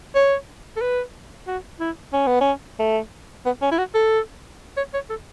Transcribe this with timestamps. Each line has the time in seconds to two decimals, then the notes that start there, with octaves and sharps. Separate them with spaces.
0.15 C#5
0.76 A4
0.81 B4
1.47 F#4
1.80 E4
2.13 C#4
2.27 B3
2.41 C#4
2.79 A3
3.46 B3
3.62 C#4
3.71 E4
3.78 F#4
3.95 A4
4.77 C#5
4.94 C#5
5.10 A4